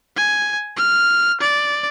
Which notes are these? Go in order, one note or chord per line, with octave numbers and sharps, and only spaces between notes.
G#5
F6
D5